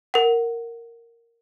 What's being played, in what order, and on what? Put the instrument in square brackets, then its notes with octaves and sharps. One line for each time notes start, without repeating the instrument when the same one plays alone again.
[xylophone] A#4 F#5